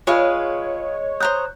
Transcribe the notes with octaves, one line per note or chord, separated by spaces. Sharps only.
G#3 F4 G#4 B4 C#5 F5
C5 A#5 D#6 F#6 G6